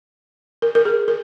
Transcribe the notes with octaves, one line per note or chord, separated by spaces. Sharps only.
A#4
A#4
G#4
A#4